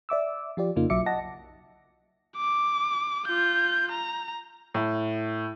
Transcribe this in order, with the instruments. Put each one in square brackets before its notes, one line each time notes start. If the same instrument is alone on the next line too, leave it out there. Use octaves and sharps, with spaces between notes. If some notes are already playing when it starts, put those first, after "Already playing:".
[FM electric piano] D5 E5 D6 E6
F3 F4 G4 D5
F2 C#3 A#3 D#4 F4
B1 F#3 E5 D6 C#7
D#5 F#5 A5 A#6
[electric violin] D6
F4 G6
A#5
[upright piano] A2